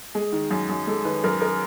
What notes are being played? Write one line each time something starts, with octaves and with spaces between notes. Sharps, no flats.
G#3 G#4
D#3
F#2
F#2
G#3 A4
D#3 B4
F#2 A#4
A#4